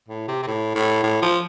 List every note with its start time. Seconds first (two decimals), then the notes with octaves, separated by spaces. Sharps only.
0.08 A2
0.28 C3
0.43 C3
0.46 A2
0.75 A2
1.03 A2
1.22 F3